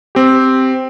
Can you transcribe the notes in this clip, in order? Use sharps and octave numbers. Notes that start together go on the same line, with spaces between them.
C4 G4